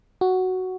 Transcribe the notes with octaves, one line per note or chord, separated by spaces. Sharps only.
F#4